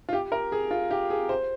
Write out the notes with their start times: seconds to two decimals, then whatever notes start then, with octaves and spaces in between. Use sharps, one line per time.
0.09 F4
0.13 G4
0.32 A#4
0.52 G#4
0.71 F4
0.91 G4
1.10 G#4
1.29 C5